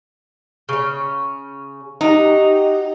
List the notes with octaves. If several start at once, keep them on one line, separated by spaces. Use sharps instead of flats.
C#3 C#4
D#4 F#4 G4 D#5